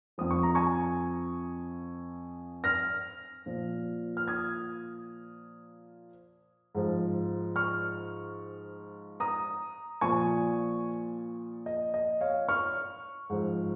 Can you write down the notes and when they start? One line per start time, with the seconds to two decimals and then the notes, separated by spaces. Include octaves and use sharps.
0.18 F2 F3 D#6
0.31 C#6
0.43 A#5
0.55 G#5 C#6
2.64 F6 A#6
3.46 A#2 F3
4.17 F6
4.28 D#6 G#6
6.75 G#2 F3
7.56 C#6 F6
9.20 A#5 D#6
10.01 A#2 F3 G#5 C#6
11.66 D#5
11.94 D#5
12.21 C#5 F5
12.49 C#6 F6
13.30 G#2 F3